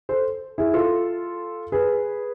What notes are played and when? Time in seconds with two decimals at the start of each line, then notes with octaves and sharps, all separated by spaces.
0.09 A4 C5
0.58 E4 G#4
0.74 F4 A4
1.72 G#4 B4